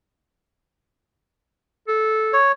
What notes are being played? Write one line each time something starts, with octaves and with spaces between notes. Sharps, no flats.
A4
C#5